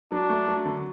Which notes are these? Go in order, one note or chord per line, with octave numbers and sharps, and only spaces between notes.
F#3 D4
A3
F#3
D3